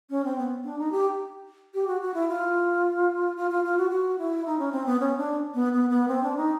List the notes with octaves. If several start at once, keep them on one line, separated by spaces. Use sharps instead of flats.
C#4
C4
B3
D4
D#4
G4
G4
F#4
F#4
E4
F4
F4
F4
F4
F#4
F#4
E4
D#4
C#4
C4
B3
C#4
D4
B3
B3
B3
C4
D4
D#4